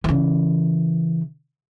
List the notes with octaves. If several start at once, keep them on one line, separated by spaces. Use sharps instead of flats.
C#3 E3